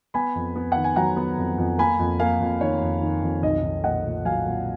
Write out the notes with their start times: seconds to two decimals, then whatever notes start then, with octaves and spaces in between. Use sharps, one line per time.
0.14 B3 G#5 B5
0.35 F2
0.56 B3
0.72 D#3 F#5
0.84 G#5
0.96 F#3 F#5 A#5
1.16 B3
1.38 F2
1.58 F2
1.78 A#3 G#5 B5
1.99 F2
2.19 A#3 F5 G#5
2.40 F2
2.61 D#3 C#5
2.82 F2
3.01 D#3
3.22 F2
3.43 B1 D#5
3.63 B1
3.84 A#2 D#5 F#5
4.05 A#2
4.25 F#3 F5 G#5
4.45 A#2